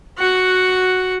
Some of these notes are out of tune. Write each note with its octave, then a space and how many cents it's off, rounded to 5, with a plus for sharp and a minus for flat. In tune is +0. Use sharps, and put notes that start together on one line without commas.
F#4 +0 F#5 +0